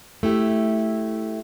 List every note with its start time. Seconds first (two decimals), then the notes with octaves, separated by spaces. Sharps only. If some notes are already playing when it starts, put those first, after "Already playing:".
0.23 A3 E4 G4